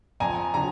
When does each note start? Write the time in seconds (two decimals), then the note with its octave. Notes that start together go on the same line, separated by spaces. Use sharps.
0.20 F2 G#5 A#5
0.54 D3 F#3 G#5 A#5